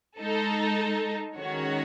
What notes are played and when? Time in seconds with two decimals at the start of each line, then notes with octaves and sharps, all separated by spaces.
0.19 G#3 D#4 A4
1.36 D#3 G#3 C#4 F#4 C#5